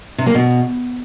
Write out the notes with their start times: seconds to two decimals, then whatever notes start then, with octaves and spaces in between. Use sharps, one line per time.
0.18 C3
0.26 A#3
0.35 B2